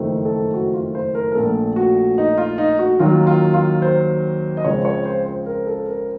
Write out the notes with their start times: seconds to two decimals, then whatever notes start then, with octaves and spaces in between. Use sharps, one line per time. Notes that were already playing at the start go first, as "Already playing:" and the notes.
Already playing: F#1 F2 D#3 A3 C4
0.25 A4
0.54 F#4
0.74 F4
0.95 C5
1.15 A#4
1.32 A#4
1.35 A#1 A#2 A3 A4
1.76 F#4
2.18 D#4
2.38 F4
2.58 D#4
2.79 F#4
3.00 D#2 D#3 F#3 F4
3.27 F4
3.54 F4
3.82 C5
4.57 D#5
4.64 C#2 C#3 F3 C4 C#5
4.85 C#5
5.06 C5
5.26 C5
5.46 A#4
5.67 A4
5.88 A#4